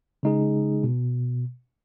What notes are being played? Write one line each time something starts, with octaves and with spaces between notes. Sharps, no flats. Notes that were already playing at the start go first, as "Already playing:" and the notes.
C#3 G#3 D#4 G#4
B2